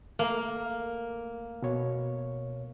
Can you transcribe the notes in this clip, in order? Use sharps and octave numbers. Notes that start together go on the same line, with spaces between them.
A3 A#3 A#4
B2 C#5